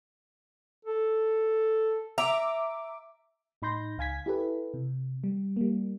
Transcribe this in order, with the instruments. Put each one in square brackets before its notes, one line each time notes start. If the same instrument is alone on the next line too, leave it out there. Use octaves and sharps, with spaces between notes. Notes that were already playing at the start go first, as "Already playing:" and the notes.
[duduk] A4
[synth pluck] E5 D6 [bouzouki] A#5
[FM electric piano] A2 D#4 B5 C6 G6 A#6
C#2 F5 G#5 G#6 B6
E4 G4 A4 B4
C3
G3
G3 A#3